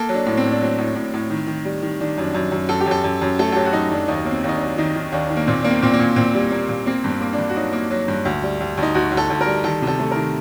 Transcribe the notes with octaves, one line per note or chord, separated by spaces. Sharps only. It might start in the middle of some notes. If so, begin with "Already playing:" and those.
Already playing: A#3 A4
F#3
D4
A2
C4
A2
D4
F#3 C4
A2
A2
A2
D#3
D#3
G3
D#3
D#3 D4
F#2
D4
F#2
F#2
F#2 A4
G4
F#2 A4
F#2
F#2
A3 A4
A4
F#3 G4
F#4
F#2 D#4
F#2 D4
D#2 D#4
F#3 A#3
C4
D#2 D#4
D4
F#3
D#3 D#4
D#3
D#2 D4
D#3
A#3
A#2 C4
A#3 D4
C4
A#2 C4
A#3
A#2
A#2 C4
G3
A#3
A#2
A#3 C4
G2
C4
A#3
D4
G2
F#4
F#3 D#4
A#3
F#3
G2
D2
G3
D2
D2
D#4
D2 F#4
D2
A4
D2
A#4
G3
D#3 A4
C3
A4
A3
D#3 A#4